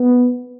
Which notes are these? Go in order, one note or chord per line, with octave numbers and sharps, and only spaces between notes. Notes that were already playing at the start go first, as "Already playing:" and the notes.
Already playing: B3